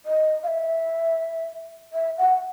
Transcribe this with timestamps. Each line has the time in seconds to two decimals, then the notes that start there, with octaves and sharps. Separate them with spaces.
0.06 D#5
0.43 F5
0.48 E5
1.93 E5
2.18 F#5